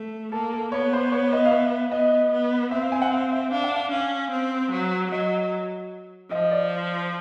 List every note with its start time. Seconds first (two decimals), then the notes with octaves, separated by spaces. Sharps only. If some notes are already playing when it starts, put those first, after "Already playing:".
Already playing: A3
0.32 A#3 A4
0.52 A4
0.72 B3 C#5
0.93 C5
1.12 C#5
1.33 D#5
1.45 F5
1.52 E5
1.92 B3 D#5
2.32 B3
2.71 C4 E5
2.82 F5
2.92 G#5
3.02 F#5
3.12 F5
3.32 E5
3.51 D4 F5
3.64 F#5
3.75 F5
3.92 C#4 F5
4.31 C4
4.71 F#3
5.11 F#3 D#5
6.30 F3 D#5
6.51 D5